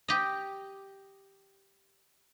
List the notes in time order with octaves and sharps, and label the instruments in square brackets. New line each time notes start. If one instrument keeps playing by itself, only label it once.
[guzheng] G4 D#5